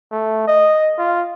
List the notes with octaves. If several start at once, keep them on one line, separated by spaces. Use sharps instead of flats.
A3
D#5
F4